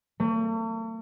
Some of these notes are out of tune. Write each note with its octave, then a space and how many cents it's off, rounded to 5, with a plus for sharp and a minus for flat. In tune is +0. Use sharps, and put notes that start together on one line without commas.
A3 +45